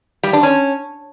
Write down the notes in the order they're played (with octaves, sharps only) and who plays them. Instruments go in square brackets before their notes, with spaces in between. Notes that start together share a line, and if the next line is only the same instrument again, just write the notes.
[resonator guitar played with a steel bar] G3
D4
C#4